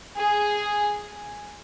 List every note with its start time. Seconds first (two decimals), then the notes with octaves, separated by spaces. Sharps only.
0.18 G#4